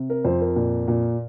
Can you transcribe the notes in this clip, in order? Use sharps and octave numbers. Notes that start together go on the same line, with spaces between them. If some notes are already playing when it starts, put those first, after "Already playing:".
Already playing: C3
A#4
F2 C5
A#4
A#2
A#2